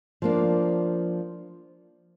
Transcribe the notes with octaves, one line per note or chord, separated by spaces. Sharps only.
F3 A#3 D4